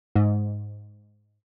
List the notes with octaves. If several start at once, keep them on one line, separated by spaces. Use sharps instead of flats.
G#2